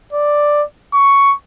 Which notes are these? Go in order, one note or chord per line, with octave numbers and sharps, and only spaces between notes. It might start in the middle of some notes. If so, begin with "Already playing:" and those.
D5
C#6